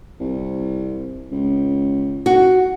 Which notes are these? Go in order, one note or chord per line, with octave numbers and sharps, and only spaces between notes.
C2
C#2
F#4